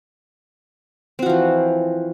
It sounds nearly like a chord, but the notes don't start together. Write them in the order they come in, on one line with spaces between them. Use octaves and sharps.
C4 F#4 F3 E3